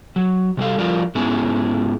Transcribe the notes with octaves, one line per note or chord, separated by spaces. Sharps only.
F#3
C3 G3 A4 F5
F3 G3 F4 A#4 D5 F5
G#2 G#3 B3 C#4 E4 G#4